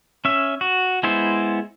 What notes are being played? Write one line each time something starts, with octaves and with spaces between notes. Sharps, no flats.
C#4 E5
F#4
G#3 B3 E4 C5